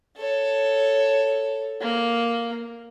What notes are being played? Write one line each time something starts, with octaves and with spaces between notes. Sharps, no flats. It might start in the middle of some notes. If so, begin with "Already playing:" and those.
A4 C#5
A#3